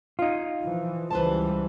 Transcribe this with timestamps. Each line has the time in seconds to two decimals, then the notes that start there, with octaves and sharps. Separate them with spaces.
0.19 D#4 F4
0.61 E3 F3
1.10 C#2 E3 G3 B4 C5 A5